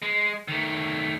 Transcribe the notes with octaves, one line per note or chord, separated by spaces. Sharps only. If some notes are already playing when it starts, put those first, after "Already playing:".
G#3
D#3 A3